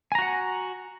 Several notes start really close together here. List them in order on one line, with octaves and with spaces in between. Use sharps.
G#5 A#5 F#4 F#5